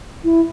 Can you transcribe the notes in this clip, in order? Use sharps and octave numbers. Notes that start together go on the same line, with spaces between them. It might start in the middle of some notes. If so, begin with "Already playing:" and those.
E4